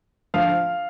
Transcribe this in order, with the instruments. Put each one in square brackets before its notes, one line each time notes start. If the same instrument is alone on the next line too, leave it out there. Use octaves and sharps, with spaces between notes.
[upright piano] D3 F3 F5